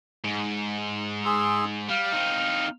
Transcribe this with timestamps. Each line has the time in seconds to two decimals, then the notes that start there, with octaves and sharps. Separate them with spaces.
0.24 G#2
1.25 G#4 C6 E6
1.90 G3 F5
2.13 C4 D#4